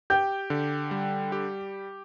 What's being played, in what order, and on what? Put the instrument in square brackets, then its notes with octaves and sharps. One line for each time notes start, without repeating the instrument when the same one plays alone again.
[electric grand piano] G4 [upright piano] G5 G6
[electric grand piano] D3
G3
G4